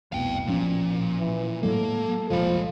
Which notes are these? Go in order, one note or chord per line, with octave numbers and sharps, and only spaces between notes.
F1 C2 B2 F5 G5
A1 A#2 F3 C#4
E3
A2 F#3 G#3 A#3 A4
F#1 C2 A#2 F3 G#3 B5